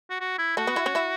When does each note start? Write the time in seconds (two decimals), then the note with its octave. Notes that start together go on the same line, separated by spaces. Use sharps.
0.10 F#4
0.20 F#4
0.38 E4
0.57 A3 F#4 A4
0.67 B3 B4
0.76 E4 E5
0.86 C#4 C#5
0.95 E4 E5